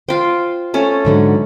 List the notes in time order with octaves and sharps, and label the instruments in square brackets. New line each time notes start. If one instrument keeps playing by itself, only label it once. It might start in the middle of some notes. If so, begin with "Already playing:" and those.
[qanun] F4 G5 [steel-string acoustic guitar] C5
[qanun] A3 C#4 A4
[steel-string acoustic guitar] G#2 D3 F#3